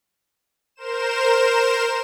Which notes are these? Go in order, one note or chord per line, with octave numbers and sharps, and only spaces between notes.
A#4 C5 E7